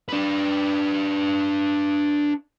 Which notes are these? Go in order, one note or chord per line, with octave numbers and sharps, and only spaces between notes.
D4 B4